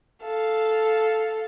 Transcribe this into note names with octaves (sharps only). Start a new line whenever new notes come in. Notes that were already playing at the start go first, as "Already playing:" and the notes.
A4 F5